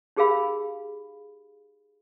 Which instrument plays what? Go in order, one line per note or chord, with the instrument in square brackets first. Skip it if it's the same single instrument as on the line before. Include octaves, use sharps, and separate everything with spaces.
[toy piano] D#4 G4 G#4 A#4 F5 B5